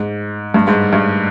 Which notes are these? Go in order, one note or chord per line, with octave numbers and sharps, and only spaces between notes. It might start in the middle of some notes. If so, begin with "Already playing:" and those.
Already playing: G#2
G2
G#2
G2